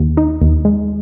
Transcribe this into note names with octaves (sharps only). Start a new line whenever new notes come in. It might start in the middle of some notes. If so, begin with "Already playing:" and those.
Already playing: D#2
D#4
D#2
G#3